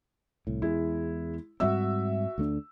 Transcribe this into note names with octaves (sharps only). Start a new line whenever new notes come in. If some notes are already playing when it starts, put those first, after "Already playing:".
C2 A2
E2 G#3 E4
G#2 G3 C4 F#4 E5 E6
D2 A3 D4